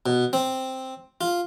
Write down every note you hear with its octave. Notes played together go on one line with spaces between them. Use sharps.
B2
C4
F4